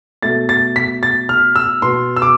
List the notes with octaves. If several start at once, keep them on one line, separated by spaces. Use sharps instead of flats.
B2 A3 A6
A6
B6
A6
F6
E6
B2 B3 C6
E6
D6